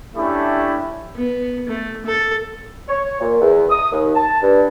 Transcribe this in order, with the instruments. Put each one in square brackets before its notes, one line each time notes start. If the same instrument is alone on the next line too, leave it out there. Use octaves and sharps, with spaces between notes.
[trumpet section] A3 C#4 D4 E4 G4
[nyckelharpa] B3
A3
A4
[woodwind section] C#5
A#2
E2
D#6
D#2
A5
G2